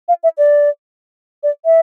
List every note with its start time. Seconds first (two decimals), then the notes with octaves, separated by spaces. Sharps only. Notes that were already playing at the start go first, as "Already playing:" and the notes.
0.08 F5
0.23 E5
0.38 D5
1.43 D5
1.65 E5